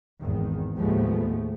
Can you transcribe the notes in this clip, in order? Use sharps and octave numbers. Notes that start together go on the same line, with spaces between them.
G#1 E2 D#3
D#2 A2 F3 G#3 A3 B3